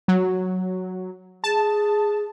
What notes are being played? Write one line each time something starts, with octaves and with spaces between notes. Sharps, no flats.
F#3
G#4 A5